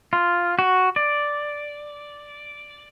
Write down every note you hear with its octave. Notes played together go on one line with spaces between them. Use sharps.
F4
F#4
D5